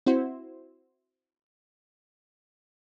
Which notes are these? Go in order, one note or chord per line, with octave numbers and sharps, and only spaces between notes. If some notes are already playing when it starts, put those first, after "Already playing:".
C4 E4 F#4 C5